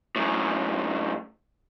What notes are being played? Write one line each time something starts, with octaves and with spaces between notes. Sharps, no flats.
F#2 A2